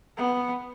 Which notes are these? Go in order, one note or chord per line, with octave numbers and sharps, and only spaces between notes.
B3